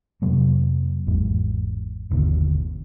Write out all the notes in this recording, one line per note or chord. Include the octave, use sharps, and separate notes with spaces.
F2 C3 F#3 A#3
G#1 E2 G#2
G1 D#2 B2 D3